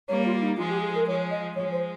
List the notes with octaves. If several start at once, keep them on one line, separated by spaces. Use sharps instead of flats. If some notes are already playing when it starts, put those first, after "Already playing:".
G3 A#3 C#5
F4
D#4
F3 G#3 F4
G4
G#4
A#4
F3 G#3 C#5
D#5
F3 G#3 C#5
C5